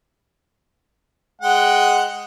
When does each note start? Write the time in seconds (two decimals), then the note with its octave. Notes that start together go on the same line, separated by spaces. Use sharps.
1.42 G#3 F#5 G5